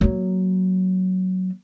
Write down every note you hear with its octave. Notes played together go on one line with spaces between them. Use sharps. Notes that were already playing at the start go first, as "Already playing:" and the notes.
F#3 A#3